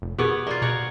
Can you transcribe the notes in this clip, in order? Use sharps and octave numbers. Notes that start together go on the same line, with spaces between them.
F1
B2 B3 G4 G#4 A#4 B4 C#5
A#3 F4 D5
B2 A#4 C#5 F#5